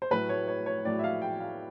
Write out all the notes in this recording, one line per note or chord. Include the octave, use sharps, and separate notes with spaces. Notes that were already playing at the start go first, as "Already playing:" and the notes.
C5
A2 F#3 A3 B4
C#5
C#5
C#5
A2 F#3 A3 D5
E5
F5
G5
F5